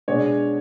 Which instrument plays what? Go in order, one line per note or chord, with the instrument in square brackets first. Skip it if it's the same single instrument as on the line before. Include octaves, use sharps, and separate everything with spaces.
[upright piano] B2 G#3 D4 C#5